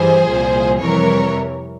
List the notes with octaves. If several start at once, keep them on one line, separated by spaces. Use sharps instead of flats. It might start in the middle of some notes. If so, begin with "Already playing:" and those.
Already playing: G2 E3 G3 G#4 C5
C2 A#2 F3
F2 C3 E3 G3 A#4 C#5